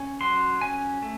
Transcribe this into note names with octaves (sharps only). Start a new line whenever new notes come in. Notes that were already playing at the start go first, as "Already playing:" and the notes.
Already playing: C#4
F#3 C6
C#4 G#5
A3